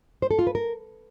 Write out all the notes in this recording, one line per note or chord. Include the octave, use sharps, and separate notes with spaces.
C5
A4
F4
B4
A#4